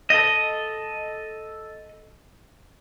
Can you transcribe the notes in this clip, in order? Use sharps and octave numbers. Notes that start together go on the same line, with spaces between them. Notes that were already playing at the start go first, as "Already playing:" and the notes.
A4 D#5